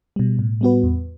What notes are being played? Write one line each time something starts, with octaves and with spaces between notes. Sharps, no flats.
B2 G3
A2
G3 B3 F#4 B4
E2